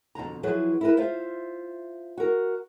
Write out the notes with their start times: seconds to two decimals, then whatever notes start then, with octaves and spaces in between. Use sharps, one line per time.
0.15 F2 B2 D3 A#5
0.43 F3 F#3 E4 G#4 B4
0.81 E4 A#4 B4
0.97 F4 C5 E5 F5
2.17 F#4 A#4